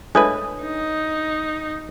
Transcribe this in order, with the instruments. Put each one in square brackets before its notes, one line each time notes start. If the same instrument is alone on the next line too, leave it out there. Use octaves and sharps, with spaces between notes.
[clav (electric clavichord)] G#3 A3 B4 [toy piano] D4 C#5 D#6
[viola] D#4